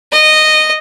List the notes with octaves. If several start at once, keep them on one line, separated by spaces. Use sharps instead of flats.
D#5